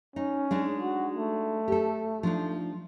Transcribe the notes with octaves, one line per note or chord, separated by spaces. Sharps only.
C#4 D#4
G#3 D4 D#4
F#4
A3
G4 A4
F3 D4 D#4